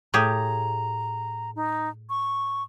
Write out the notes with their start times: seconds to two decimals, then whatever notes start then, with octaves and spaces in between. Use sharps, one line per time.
0.14 A2 G4 G#4 A#5
1.55 D#4
2.10 C#6